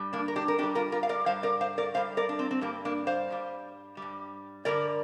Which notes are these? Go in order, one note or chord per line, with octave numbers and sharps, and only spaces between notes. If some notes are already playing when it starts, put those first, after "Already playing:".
Already playing: G2 G3
A#3 D4
A#4
D4 G4
A#4
G2 G3 D4 G4
F4 A#4
F4 A#4
F5
A#4 D5
G2 G3 C5 F5
A#4 D5
C5 F5
A#4 D5
G2 G3 C5 F5
A#4 D5
D4
C4
C4
G2 G3 A#3
A#3 D4
C5 F5
G2 G3
G2 G3
G2 D3 G3 A#4 D5